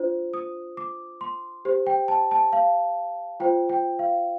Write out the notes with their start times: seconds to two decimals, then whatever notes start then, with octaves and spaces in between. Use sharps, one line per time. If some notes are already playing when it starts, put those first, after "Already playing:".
Already playing: D4 F4 C5
0.34 D#6
0.77 D6
1.21 C6
1.65 G4 C5
1.87 G5
2.08 A5
2.31 A5
2.53 F5
3.40 F4 C5 G5
3.69 G5
3.99 F5